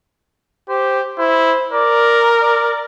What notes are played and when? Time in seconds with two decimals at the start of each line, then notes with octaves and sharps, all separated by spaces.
0.69 G4 C5
1.18 E4 C5
1.72 A#4 D5
2.42 D5